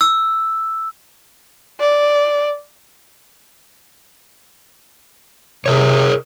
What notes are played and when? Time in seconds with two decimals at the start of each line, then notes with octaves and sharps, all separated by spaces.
0.01 E6
1.80 D5
5.66 C3 G#4 A#4 C#5